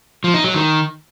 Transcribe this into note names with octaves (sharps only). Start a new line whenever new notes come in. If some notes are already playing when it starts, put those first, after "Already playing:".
F3
D#4
F#3
D#3